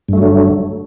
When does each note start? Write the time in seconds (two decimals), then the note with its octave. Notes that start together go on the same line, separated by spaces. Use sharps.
0.09 G2
0.13 A3
0.18 F#3
0.22 D3